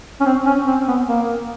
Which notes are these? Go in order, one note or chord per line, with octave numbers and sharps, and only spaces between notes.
C#4
C4
C#4
C4
B3
A#3